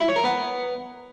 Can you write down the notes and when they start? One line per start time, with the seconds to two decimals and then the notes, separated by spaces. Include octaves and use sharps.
0.01 E4
0.08 C#5
0.16 A#4
0.24 B3